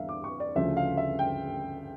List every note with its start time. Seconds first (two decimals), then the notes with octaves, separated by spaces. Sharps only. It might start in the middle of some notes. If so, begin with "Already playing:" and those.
Already playing: E2 D3 G3 E5 F5
0.09 D6
0.24 C#6
0.40 D5
0.55 D2 C#3 F3 C#4 E5
0.77 F5
0.97 E5
1.19 G5